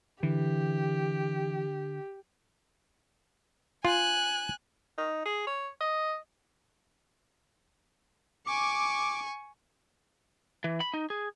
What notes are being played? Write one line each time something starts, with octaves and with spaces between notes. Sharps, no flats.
D3 E3 G4
F4 G#5 F#6
D#4
G#4
C#5
D#5
G#5 C#6 D6
E3
B5
D#4
G#4